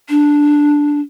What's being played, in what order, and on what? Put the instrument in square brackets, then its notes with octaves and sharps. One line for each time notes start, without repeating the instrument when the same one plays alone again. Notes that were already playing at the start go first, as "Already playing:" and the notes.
[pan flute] D4